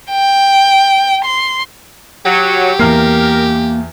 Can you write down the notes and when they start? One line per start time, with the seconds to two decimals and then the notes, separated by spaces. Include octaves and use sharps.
0.10 G5
1.25 C6
2.26 F#3 G4
2.79 E2 A#3 A#4 F6 C7